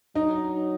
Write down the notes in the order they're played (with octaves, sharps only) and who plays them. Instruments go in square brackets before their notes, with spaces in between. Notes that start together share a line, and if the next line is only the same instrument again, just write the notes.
[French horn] F#3 [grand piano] D#4